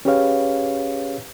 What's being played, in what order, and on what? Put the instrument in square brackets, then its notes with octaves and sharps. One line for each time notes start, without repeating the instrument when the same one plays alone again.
[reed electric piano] C#4 G4 G#4 B4 C#5 F5